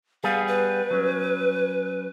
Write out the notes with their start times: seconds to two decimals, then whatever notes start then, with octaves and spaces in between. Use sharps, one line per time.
0.24 G3 B3 G#4 F5
0.48 B4
0.91 F#3 C#4